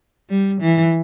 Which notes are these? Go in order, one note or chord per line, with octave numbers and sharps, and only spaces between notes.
G3
E3